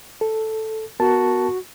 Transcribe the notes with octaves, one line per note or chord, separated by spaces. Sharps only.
A4
B3 F#4 A#4 A5